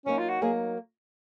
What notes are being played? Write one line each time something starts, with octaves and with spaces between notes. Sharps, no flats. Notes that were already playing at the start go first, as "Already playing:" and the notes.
F#3 A#3 C#4 D#4
F4
F#4
F#3 A#3 D#4 G#4